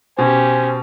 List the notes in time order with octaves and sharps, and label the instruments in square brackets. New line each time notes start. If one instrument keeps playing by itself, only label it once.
[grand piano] B2 [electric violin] C#4 G4 [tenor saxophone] C5 [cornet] G#5